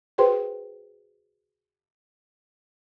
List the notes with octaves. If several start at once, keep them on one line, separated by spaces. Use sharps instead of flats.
F#4 G#4 B4 C5 G5 C6